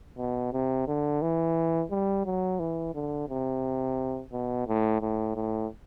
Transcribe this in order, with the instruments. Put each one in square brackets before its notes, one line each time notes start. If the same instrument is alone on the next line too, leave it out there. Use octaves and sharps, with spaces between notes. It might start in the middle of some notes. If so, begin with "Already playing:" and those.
[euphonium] B2
C3
D3
E3
G3
F#3
E3
D3
C3
B2
A2
A2
A2